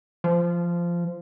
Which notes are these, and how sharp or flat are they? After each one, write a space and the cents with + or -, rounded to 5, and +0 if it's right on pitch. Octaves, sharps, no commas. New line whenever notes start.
F3 -15